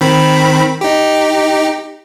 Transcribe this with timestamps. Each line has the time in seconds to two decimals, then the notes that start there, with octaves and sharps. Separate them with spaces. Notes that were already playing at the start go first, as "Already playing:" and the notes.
0.01 D#3 C4 B5
0.81 D#4 G4